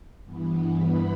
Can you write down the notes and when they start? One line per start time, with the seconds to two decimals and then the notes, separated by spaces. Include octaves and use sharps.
0.24 G2 E3 B3
0.78 B5